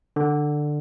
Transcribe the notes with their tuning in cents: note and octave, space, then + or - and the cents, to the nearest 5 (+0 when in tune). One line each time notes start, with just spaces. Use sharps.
D3 +15